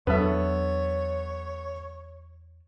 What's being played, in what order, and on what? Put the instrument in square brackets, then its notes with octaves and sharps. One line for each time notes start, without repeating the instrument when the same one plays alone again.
[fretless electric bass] E2 F#3 D4 [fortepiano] B3 A4 E5 [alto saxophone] C#5